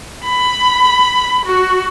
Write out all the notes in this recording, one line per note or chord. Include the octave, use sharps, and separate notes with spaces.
B5
F#4